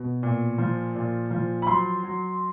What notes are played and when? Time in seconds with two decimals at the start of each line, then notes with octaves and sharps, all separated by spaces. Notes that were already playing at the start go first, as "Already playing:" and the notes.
Already playing: B2
0.23 A#2
0.58 F3
0.95 A#2
1.31 F3
1.62 B5
1.67 F#3 C6
2.03 F#3